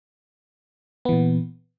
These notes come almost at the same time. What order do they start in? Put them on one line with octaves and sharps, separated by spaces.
B3 E3 A#2